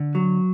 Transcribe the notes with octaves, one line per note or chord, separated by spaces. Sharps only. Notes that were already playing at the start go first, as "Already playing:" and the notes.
Already playing: D3
F#3